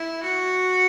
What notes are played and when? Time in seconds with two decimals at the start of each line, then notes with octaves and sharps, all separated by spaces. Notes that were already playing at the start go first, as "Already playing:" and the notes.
Already playing: E4
0.23 F#4